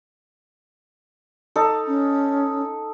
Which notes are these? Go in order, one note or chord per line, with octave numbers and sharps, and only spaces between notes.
D#4 A4 D6
C#4